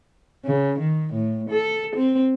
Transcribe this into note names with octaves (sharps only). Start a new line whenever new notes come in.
C#3
D#3
A2
A4
C4